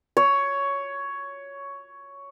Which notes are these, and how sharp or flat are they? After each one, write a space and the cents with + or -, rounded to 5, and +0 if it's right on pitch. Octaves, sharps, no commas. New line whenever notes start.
C#5 +10